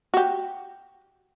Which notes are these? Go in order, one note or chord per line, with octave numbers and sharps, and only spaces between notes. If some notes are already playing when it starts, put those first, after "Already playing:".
F#4 G4